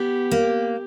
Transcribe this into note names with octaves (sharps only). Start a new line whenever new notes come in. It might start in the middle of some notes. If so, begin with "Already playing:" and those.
Already playing: B3 G4
A#3